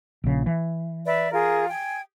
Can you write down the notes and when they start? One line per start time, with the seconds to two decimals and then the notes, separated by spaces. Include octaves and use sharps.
0.24 A#1 C#3
0.46 E3
1.05 B4 D5 E5
1.32 F4 G#4 A#4
1.68 G5 G#5